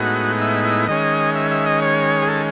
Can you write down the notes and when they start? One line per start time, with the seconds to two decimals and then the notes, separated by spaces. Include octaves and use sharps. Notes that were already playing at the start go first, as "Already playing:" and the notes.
Already playing: A2 G#3 B3 D#4 F#4
0.41 E4
0.64 E4
0.88 D#3 G#3 C#4 D#5
1.35 E5
1.51 E5
1.66 D#5
1.82 C#5
2.22 G#4
2.28 A4